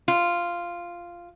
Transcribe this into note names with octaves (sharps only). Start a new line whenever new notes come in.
F4